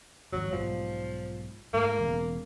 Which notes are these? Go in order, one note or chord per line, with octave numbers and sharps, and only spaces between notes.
G#1 F2 F#3
B1 G#2 F3 G3
G#2 A3 A#3
E1 E2 C#3